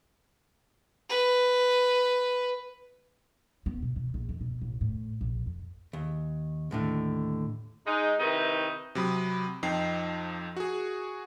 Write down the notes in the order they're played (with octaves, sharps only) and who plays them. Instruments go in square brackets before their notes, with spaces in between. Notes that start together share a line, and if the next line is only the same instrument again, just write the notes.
[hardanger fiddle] B4
[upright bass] B3
B2
E3
A#1
F2
B2
A1
A2
A#1
F2
[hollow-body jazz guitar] D#2
D#2 A2 D3
[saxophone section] G#3 D#4
C3 D#3 D#4 E4 B4
[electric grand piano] C3 F#3 B5 D#6
F2 F3 D#4 G5 C7
F#4 G#4